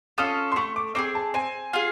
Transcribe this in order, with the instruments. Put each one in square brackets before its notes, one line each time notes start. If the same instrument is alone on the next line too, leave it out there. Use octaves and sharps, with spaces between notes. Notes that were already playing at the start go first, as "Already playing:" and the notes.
[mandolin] C#4 F4 A4 [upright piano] D#6
[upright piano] C6
[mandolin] A3 [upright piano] C#6
[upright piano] D6
[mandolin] C4 D#4 G#4 [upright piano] D6
[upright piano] A5
[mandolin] C4 [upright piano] G#5
[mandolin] F4 G#4